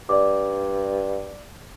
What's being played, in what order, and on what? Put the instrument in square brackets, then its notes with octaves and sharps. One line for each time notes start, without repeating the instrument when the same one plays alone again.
[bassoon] G2 [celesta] D5 D6